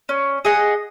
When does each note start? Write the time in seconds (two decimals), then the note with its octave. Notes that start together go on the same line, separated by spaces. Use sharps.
0.09 C#4
0.45 G#4 D#5 F#5